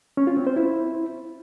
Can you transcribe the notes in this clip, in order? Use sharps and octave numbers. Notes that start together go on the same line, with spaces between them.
C#4
F4
C4
C5
E4